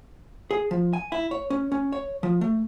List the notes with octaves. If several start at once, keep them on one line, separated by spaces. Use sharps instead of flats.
G#4
F3
G#5
E4
C#5
C#4
C#4
C#5
F3
A3